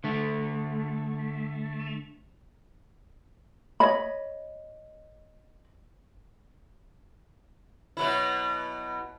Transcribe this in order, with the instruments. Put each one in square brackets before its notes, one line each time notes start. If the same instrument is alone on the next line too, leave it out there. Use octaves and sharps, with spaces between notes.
[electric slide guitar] D3 A3
[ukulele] C#5 D#5 B5
[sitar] B2 F#3 E4